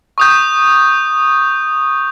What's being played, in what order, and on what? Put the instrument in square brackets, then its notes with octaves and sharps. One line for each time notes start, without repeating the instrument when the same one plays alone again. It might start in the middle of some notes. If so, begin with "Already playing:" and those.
[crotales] C#6 D#6 G6